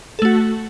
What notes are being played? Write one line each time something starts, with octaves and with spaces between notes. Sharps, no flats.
A3 F#4 A4